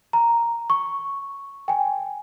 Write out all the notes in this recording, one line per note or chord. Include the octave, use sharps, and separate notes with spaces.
A#5
C#6
G5 G#5